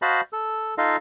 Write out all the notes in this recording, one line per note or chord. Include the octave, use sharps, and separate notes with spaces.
F#4 C5 D#5 F5 A5 B5
A4
D#4 F4 A4 D#5 F5